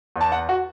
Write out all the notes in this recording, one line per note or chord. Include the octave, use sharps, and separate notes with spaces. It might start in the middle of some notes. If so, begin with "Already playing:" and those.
E2
A5
F#5
F#4